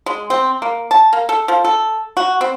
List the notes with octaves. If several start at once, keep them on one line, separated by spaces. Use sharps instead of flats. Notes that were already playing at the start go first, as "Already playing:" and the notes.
G#3
C4
A#3
A5
A#3
A4
F3
A4
F#4
C4